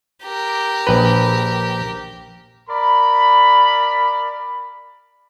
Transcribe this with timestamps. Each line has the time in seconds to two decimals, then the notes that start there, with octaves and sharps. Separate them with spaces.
0.24 G4 A#4
0.87 A#1 B4
2.69 A#4 D5 B5